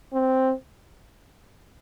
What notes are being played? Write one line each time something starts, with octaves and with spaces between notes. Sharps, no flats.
C4